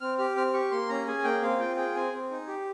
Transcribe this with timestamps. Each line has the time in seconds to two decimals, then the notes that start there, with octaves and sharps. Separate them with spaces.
0.01 C4 F6
0.18 G4 F6
0.36 C4 F6
0.54 G4 C#6
0.71 A#3 C6
0.89 C#4 A#5
1.07 G#4 G#5
1.24 A#3 G5
1.42 C4 F5
1.60 F4 G5
1.77 G#4 G5
1.95 C4 G#5
2.13 C4
2.31 D#4
2.47 G4